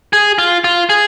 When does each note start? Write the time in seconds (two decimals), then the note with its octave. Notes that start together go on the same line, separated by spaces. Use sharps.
0.13 G#4
0.38 F4
0.64 F4
0.89 G#4